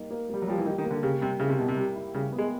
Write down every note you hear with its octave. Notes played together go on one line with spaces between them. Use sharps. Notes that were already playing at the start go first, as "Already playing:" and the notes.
Already playing: G3 A#3 D#4
A#3
G3 A#3
F#3
F3 G3
E3
D#3 G3
D#3
A#3
D3
C#3 G4
C3 G3
C#3 E4
C3
B2 G3
C3
G3
E4
C#3 G3
B3
G#3